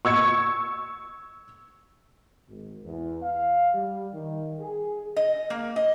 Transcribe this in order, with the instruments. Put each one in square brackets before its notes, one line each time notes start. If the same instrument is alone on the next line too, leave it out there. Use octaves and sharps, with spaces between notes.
[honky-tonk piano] C#6 E6 G#6 C#7
[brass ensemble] G#1
E2
F5
G3
D#3
G#4
[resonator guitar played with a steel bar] D#5
A#3
D#5